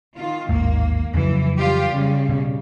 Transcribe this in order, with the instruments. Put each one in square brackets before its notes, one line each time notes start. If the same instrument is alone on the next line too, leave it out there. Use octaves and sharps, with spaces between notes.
[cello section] D#3 F4
[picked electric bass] A1 D#2 G#2 [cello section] A#3
[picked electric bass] F2 C#3 F#3 [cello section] E3
[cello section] G3 F4 G4
C#3 G3
[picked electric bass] B2